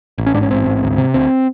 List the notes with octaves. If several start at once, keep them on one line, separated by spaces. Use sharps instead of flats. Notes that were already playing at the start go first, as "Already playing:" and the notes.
A1
C#4
G#2 D4
C#4
A1 C4
G#2
D2
C3
D2 C4